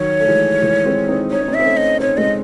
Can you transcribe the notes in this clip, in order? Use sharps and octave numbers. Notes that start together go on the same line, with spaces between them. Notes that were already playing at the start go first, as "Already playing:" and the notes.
Already playing: D#3 F#3 C#5
A3
E3 G#3
E3 G#3
G#3 C4
C4 D#4
D#4 C#5
C#4
C4 D#4
E5
C4
A3 C#4
D#5
C4 D#4 C#5
G#3 C4 D#5